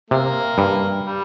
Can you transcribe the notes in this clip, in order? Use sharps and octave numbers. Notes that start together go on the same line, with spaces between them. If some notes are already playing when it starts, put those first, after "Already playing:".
C3 A#3
G2
G3